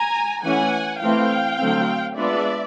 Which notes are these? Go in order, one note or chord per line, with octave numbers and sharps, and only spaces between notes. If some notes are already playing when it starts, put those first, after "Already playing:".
Already playing: G#5 A#5
E3 A3 C#4 F#5 G#5
E3 A3 C4 E4 F5 G5
D3 F#3 A3 C4
G#3 B3 D4 F4 D5 E5